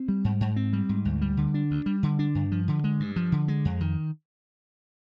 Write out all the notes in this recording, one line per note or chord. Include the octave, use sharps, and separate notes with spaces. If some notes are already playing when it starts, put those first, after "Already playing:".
Already playing: C4
G3
G#2
G#2
C4
G3
G#2
D2
G3
D3
D4
D2
G3
D3
D4
G2
F3
D3
G#3
G2
F3
D3
G#3
F2
D#3